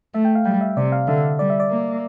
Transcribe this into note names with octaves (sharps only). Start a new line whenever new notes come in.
A3 E5
G5
F5
G3 G5
E5
C3 D5
F5
D3 E5
G3 D5
E5
D5
A#3